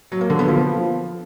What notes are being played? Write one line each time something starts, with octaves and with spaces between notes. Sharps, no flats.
F#3
A#3
D3
B3
F3